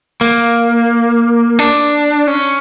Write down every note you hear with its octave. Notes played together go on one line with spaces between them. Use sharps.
A#3
D4
C#4